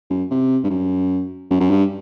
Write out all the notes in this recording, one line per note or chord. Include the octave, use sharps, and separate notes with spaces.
F#2
C3
G2
F#2
F#2
F#2
G2